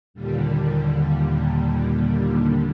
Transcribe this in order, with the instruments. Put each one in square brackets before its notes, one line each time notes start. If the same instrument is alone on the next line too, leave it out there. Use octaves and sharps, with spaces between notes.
[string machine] D#2 A#2 D3 G3